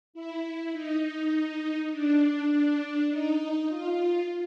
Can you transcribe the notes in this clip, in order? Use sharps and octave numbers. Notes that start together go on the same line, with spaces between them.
E4
D#4
D4
D4
D#4
F4